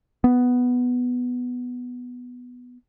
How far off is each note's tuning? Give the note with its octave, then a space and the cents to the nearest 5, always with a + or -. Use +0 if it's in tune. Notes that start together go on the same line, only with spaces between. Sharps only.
B3 +0